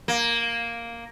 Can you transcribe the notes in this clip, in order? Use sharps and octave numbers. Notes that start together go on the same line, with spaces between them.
A#3